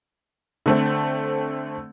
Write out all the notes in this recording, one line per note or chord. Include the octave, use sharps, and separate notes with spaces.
D3 A3 C4